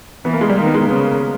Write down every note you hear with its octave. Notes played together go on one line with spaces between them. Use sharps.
E3 B3
A#3
G#3
G3
D#3 A#3
B3
G#3
A#3
C#3 B3